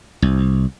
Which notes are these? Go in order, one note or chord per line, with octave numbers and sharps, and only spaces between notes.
C2